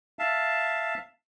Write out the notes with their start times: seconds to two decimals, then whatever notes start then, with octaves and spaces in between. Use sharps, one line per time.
0.19 E5 F5 A5